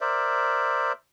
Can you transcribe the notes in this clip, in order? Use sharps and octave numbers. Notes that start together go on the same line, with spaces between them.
A#4 C5 D5 E5